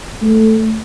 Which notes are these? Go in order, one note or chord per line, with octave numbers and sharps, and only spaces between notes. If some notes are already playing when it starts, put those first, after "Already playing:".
A3